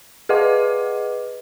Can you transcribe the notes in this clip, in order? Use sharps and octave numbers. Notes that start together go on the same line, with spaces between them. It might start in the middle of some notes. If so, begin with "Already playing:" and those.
G#4 B4 D#5 F#5 D6